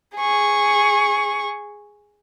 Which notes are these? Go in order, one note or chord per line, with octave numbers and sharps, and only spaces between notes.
G#4 C#6